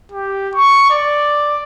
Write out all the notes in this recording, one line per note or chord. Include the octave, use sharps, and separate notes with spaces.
G4
C#6
D5